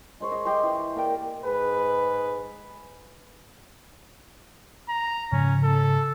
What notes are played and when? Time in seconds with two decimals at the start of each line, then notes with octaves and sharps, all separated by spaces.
0.20 G#3 C5 C#5
0.32 D#5
0.45 G4 D#5 C6
0.63 E3
0.96 A#3 A#4 D5 G5
1.45 G#2 G#4 B4
4.89 A#5
5.32 G#2 C#3 F3 C#4
5.63 A4